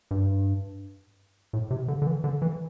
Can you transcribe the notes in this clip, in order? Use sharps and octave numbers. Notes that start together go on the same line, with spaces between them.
G2
A2
C3
D3
D3
E3
D3
E3